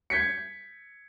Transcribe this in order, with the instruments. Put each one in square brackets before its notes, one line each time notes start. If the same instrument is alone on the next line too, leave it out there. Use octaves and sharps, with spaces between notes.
[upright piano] G6 G#6 B6 C#7